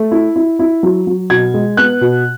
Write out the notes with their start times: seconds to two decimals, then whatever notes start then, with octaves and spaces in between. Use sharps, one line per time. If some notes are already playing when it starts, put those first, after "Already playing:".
Already playing: A3
0.11 E4
0.36 E4
0.59 E4
0.83 F#3
1.07 F#3
1.30 B2 G#6
1.54 G#3
1.77 B3 F#6
2.01 B2